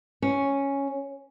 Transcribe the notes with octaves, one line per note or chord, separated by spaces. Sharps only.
C#4